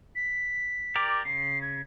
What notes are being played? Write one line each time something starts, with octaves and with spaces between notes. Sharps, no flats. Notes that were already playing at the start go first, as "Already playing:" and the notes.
B6
G4 A#4 D5
C#3 C7
G#6